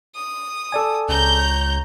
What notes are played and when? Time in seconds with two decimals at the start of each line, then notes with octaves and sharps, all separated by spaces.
0.15 D#6
0.72 A4 D5 G#5
1.09 C#2 C#5 A#5 G6